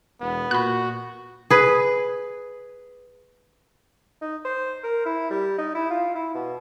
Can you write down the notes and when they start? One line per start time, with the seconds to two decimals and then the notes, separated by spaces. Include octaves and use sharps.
0.20 E1 B3
0.51 A#2 F#4 B5 F#6
1.50 G#4 B4
4.22 D#4
4.45 C5
4.83 A#4
5.06 E4
5.30 G3
5.58 D#4
5.75 E4
5.90 F4
6.15 E4
6.35 B2